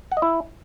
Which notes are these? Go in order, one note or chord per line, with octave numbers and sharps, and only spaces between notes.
F#5
D#5
E4